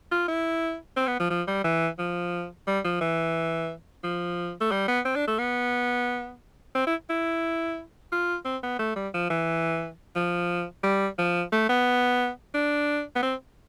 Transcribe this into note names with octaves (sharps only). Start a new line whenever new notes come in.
F4
E4
C4
B3
F3
F3
G3
E3
F3
G3
F3
E3
F3
A3
G3
B3
C4
D4
A3
B3
C4
E4
E4
F4
C4
B3
A3
G3
F3
E3
F3
G3
F3
A3
B3
D4
B3
C4